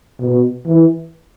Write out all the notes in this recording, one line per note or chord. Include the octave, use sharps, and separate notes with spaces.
B2
E3